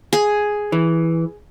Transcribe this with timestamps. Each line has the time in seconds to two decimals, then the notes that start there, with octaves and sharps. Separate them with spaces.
0.13 G#4
0.72 E3